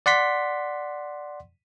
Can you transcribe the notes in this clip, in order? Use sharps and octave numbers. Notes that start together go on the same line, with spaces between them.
D5 F#5 C6 B6